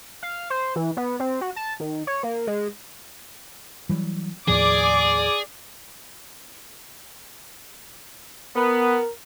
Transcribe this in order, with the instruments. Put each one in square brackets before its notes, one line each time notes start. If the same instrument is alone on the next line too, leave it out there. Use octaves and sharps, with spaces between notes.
[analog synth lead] F5
C5
E3
B3
C4
F#4
A5
D#3
C#5
A#3
G#3
[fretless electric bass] E3 F#3 G3
[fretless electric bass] D#2 A2 F3 [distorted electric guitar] G#4 [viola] D5 D6
[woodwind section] B3 [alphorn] A#4